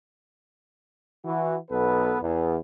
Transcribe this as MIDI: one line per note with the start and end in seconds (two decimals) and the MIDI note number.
1.24 1.56 52
1.24 1.56 66
1.70 2.18 35
1.70 2.18 59
1.70 2.18 69
1.70 2.18 71
2.22 2.57 40